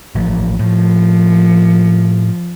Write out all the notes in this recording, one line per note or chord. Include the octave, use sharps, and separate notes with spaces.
A1 F3
A2 F3